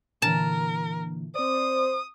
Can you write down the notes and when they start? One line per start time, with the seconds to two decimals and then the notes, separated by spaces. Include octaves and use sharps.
0.22 A#2 D3 E3 A#4 A5
1.35 C4 C5 D5 D#6